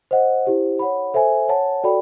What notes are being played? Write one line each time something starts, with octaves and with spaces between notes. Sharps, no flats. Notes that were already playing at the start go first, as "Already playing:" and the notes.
C5 D#5 F#5
E4 G4 C5
C#5 F#5 B5
A4 C5 E5 G#5
C#5 F#5 A5
F#4 A4 D5 G5 B5